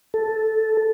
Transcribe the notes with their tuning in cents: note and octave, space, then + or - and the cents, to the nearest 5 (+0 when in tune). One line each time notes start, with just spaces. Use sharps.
A4 -5